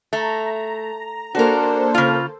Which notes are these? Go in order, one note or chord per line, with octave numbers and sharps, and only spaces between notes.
A3 A#5
A#3 D4 F#4 A4 A#4 C5
C#3 F4